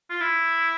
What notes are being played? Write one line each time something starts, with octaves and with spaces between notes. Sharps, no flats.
F4
E4